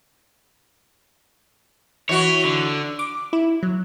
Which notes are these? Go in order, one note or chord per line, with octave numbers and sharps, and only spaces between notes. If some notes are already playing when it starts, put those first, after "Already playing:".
E3 F#4 C#5
D3
D6
E4
F#3